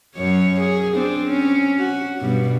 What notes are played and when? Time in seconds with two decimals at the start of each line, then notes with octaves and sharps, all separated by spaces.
0.16 F#2 C#5
0.61 G#4
0.95 C4 D4
1.27 C#4
1.79 F#4
2.21 G2 B2